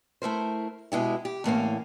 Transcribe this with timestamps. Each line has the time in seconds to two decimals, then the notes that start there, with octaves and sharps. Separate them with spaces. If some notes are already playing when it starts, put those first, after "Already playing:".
0.22 A3 E4 A#4 C5
0.92 B2 G#3 E4 G4
1.25 G4
1.44 E2 A2 A#3 C#4